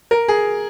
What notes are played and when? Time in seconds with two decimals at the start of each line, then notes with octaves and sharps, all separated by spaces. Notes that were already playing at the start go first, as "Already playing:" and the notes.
0.11 A#4
0.28 G#4